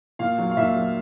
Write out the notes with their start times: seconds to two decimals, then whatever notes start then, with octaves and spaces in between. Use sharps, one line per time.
0.19 A#2 F5
0.38 F#3
0.51 F5
0.57 A#2 E5
0.76 F#3